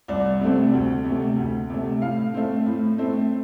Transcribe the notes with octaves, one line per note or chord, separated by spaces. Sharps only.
C2 D5
C3 A3 C4
D2
C3
A3
D2
C3 A3
A2 F5
A3 C4
A2
A3 C4